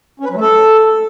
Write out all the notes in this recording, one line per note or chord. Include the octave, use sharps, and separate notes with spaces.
C#4
B4
F#3
A3
A4